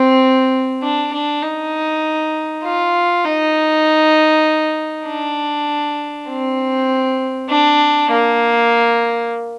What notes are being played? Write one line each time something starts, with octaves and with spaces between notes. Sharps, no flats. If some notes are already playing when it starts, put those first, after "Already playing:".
Already playing: C4
D4
D4
D#4
F4
D#4
D4
C4
D4
A#3